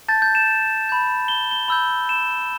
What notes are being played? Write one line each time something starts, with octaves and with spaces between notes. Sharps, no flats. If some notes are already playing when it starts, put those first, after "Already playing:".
A5 G6 A6
G6
E7
B5 G6
G7
G7
B5 E6 G6
E7